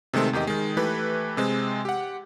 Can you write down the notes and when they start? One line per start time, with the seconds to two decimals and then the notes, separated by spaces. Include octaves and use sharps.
0.13 C3 D#3 G#3 A3 C4
0.33 E2 D#3 G4 D#5
0.47 D#3 G#3
0.77 E3 A3 G4 B4
1.37 C3 G#3 C4
1.85 G4 F#5